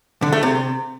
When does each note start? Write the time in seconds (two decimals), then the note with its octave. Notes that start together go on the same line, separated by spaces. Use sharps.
0.22 D3
0.33 A3
0.43 C3